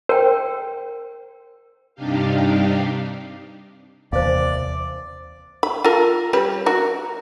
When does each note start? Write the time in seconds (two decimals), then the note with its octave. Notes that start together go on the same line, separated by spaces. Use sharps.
0.09 A#4 C5 G5
1.95 G2 C3 D4 D#4 G4 F5
4.12 D#2 C3 E3 C5 D5 F5
5.63 B5
5.84 F4 A4 A#4
6.33 G3 C#4 B4
6.66 F#4 A#4